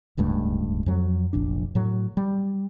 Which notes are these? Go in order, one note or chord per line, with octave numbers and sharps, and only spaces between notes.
D1 C#2 G2 A3
F2 F#3
F1 A#1 D4
A2 F#3
G3